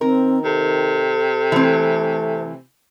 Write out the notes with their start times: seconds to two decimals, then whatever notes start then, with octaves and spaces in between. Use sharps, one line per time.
0.01 D#3 C4 A#4
0.44 C3 A4
1.52 E3 A3 C4